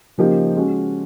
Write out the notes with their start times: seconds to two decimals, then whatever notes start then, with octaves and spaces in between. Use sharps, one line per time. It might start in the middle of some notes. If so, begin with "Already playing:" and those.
0.18 C#3 F3 A#3 D#4 G4
0.55 G#3 C#4 F#4